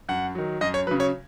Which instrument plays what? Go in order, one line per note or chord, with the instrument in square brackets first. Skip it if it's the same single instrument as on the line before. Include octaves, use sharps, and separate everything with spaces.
[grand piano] F#2 F#5
D#3 F#3
F#2 D#5
C#5
F#3 B4
C#3
C#5